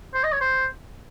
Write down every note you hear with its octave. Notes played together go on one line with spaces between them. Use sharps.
C5
D#5
C#5
C5